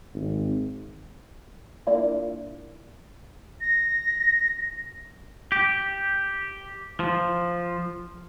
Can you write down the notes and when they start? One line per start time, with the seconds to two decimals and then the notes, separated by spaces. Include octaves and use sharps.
0.14 G#1
1.87 A#3 D4 E4 F4
3.61 A#6
5.52 G4
7.00 F3